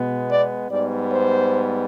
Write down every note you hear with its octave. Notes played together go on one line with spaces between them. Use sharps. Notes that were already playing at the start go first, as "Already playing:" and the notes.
Already playing: B2 G#3 B3
D5
G#2 G3 B3 D5
C5